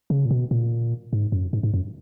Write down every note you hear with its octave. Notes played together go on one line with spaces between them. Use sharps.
C#3
A#2
B2
A#2
G#2
F#2
G#2
G#2
F#2